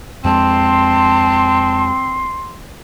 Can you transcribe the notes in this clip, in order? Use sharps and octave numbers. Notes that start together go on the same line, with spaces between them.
F2 G#3 C4 A5 C6